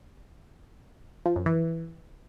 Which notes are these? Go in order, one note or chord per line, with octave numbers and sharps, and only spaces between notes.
F3
F#2
E3